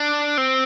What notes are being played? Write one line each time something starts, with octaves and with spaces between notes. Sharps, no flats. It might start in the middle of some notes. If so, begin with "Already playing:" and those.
Already playing: D4
C4